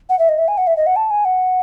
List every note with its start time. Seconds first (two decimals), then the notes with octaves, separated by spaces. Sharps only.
0.09 F#5
0.19 E5
0.29 D#5
0.38 E5
0.48 G#5
0.58 F#5
0.67 E5
0.77 D#5
0.86 F#5
0.96 A5
1.11 G#5
1.25 F#5